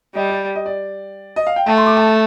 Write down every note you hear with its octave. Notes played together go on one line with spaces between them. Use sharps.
G3 D#5
D5
D#5
D5
D#5
F5
G5
A3 A5
C6
D6
A5
A5